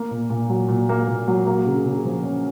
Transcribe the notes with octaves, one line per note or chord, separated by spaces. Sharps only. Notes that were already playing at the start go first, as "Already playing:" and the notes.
Already playing: A#3
A#2
A#2
F#3
A#2
A#3
A#2
F#3
A#3
C#3
C#3
F3
C#4